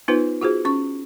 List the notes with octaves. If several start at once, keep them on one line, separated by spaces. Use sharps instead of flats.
B3 D#4 F4 B4 C5
F4 F#4 G#4 C5
C#4 C#6